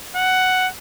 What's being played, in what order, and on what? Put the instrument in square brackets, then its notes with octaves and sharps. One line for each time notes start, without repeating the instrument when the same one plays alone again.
[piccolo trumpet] F#5